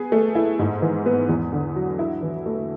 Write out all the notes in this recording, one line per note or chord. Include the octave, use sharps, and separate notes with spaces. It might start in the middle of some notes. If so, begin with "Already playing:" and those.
Already playing: B3 G#4
A3
E4
G#2
E3
B3
E2
D3
F#3
E4
E3
A3